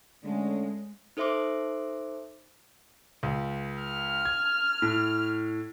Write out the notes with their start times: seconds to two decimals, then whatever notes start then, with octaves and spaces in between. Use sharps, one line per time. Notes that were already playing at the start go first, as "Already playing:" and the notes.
0.24 D3 G#3 A3 C#4
1.17 D#4 A4 C5 E5 C6 D6
3.23 C#2
3.83 F6
4.25 G#6
4.82 A2